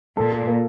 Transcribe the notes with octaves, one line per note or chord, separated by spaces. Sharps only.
A#2 A4
A4
A#3